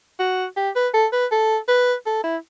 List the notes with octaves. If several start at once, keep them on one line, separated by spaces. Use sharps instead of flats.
F#4
G4
B4
A4
B4
A4
B4
A4
E4